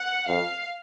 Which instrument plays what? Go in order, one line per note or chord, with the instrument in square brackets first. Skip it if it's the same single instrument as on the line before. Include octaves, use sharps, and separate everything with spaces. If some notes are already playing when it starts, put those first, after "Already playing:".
Already playing: [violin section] F#5
[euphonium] F2 [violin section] F5